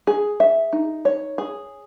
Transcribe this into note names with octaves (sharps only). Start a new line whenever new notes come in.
G#4
E5
D#4
C#5
G#4